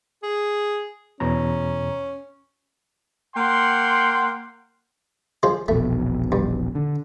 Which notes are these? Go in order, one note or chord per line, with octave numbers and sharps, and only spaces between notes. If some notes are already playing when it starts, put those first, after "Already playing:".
G#4
E2 B2 C#4 A#5
A#3 F#5 G5 C6
F3 G#3 C5
E1 A#1 B2 A3
G2
D3